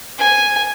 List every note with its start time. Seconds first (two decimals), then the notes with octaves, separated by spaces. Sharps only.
0.18 G#5